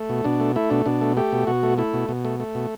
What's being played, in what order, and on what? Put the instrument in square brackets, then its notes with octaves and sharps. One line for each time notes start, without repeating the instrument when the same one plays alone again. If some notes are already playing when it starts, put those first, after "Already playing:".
Already playing: [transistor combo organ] A3
B2
B2 D4
A3
A3 E4
B2 D4
B2 D4
A3
A3 G4
B2
B2 F#4
A3
A3 E4
B2
B2
A3
A3
B2